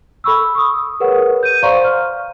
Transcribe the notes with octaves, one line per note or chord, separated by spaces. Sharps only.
A4 B5 C#6 E6
C#6 D#6
G#4 A#4 B4 C#5 F#5
G6 D#7
C5 D5 F5 A#5 C6 C#6
F6